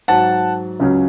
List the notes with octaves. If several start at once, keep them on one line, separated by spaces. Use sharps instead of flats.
G#2 F#3 F#5 A5
C#2 C#3 F#3